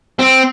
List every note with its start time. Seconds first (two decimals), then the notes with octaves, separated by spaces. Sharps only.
0.19 C4